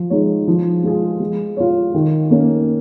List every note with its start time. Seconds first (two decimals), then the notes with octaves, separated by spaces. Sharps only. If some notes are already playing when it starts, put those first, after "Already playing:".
Already playing: F3
0.10 G#3 D#4 C#5
0.47 F3
0.83 G#3 F4 G#4
1.20 G#3
1.57 F4 C#5
1.94 D#3
2.31 A#3 C#4